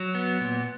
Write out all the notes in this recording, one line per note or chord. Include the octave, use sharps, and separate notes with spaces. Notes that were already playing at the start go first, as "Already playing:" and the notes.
Already playing: F#3
B3
A#2